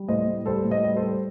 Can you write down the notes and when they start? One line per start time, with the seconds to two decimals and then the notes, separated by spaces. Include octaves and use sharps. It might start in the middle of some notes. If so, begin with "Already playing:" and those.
Already playing: G3
0.08 A2 C5 D#5
0.28 A2
0.46 G3 A4 C5
0.65 A2
0.71 C5 D#5
0.84 G3
0.97 A4 C5
1.03 G3